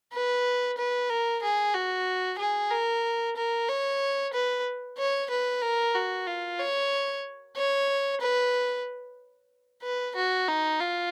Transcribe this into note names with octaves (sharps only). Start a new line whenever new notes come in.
B4
B4
A#4
G#4
F#4
G#4
A#4
A#4
C#5
B4
C#5
B4
A#4
F#4
F4
C#5
C#5
B4
B4
F#4
D#4
F4